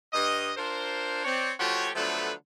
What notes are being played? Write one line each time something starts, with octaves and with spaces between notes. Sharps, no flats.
G2 D#5
D4 F4 A#4 C5
C4 C#5 D5
F3 A3 F#4 G4 C#5
D3 F3 F#3 A3 B3 B4